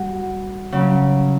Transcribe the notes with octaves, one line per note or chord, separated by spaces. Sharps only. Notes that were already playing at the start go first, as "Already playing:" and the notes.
Already playing: G3 F#4
C#3 F#3 C#4